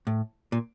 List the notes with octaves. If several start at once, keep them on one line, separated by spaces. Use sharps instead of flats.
A2
A#2